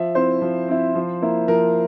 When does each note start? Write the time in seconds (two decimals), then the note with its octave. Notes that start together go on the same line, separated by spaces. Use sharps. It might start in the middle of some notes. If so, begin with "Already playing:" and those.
Already playing: F3 E5
0.15 C4 E4 C5
0.42 F3
0.68 C4 E4
0.95 F3
1.22 A#3 E4
1.48 F3 A#4